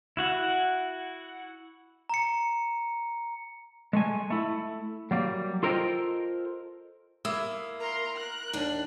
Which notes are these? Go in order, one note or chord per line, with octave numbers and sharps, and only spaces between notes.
E4 F#4 F#5
A#5 C#7
G#3 A3 G#5
A3 E4
F#3 G3 A#3
F4 A4 A#4 C5 D#5 G5
A#3 E4 D#6 E6
A#4 A#5 C6
F#6
D#2 D4